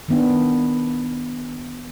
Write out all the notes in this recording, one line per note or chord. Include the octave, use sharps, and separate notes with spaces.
D#3 B3 D4